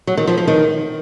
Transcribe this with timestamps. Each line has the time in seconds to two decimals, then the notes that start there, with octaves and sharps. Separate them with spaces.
0.07 F#3
0.17 D#3
0.27 F3
0.38 F3
0.48 D#3